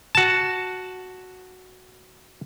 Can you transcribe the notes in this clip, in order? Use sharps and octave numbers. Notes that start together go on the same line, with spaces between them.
F#4 A5